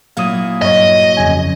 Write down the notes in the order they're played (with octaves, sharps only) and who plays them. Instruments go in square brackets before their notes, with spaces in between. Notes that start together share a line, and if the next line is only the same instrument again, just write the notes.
[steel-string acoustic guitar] A#2 F#3 E4 [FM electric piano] F5 D#6
[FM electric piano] G2 C#5 [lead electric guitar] D#5
[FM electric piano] F2 C#3 G#5